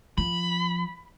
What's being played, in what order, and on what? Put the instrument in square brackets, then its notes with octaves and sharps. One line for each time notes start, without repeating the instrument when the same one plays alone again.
[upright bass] F3 [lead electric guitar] B5